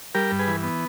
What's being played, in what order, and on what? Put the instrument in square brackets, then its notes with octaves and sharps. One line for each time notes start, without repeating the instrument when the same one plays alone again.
[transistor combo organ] G3 G4 A#4
G2
G#4 B4
E3
B3